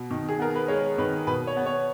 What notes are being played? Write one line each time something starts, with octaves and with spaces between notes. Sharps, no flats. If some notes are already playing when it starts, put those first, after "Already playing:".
Already playing: B2
D#3
G#4
B3 A#4
B4
G#3 C#5
D#3 B4
B2 B4
C#5
B3
C#5